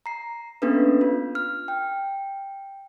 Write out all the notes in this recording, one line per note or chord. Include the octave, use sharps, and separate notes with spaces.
A#5 C7
A#3 B3 C#4 D4 A4 B4
F4
F6
G5